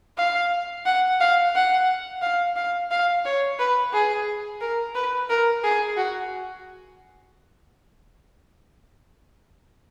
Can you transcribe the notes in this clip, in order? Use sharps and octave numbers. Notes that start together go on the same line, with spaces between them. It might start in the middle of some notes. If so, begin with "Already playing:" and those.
F5
F#5
F5
F#5
F5
F5
F5
C#5
B4
G#4
A#4
B4
A#4
G#4
F#4